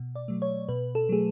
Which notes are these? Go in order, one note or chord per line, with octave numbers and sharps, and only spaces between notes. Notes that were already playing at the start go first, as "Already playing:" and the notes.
Already playing: B2
D5
F#3 A3
C#5
B2 B4
A4
F#3 A3 G#4